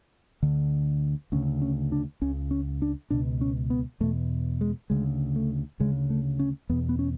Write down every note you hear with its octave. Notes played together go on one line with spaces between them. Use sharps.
D2 D3
D2 C#3 C#4
C#4
D4
C#2 C#3 C#4
C#4
D4
C#2 B2 D4
C#4
B3
E2 B2 A3
G#3
D2 C#3 G#3
A3
D2 C#3 G#3
A3
C#4
E2 B2 B3
B3
C#4